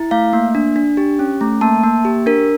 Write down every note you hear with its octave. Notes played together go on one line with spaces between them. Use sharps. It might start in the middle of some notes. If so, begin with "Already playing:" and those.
Already playing: E4
A3 F5
A#3
D4
D4
G4
C#4
A3
A#3 A5
A#3
G4
D4 A#4